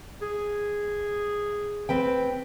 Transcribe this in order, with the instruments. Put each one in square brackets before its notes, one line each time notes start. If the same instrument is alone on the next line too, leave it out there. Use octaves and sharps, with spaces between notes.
[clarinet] G#4
[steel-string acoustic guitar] C4 B4 G5